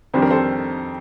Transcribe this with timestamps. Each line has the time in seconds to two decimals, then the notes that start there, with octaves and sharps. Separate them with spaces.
0.14 F2 D#3 G3 D4 C5
0.22 A#4
0.31 A4 C5